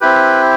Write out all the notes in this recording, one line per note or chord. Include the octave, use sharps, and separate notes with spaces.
C4 E4 G4 B4